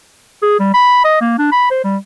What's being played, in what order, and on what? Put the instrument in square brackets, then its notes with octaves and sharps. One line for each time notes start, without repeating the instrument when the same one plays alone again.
[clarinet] G#4
G3
B5
D#5
A#3
D4
B5
C5
G3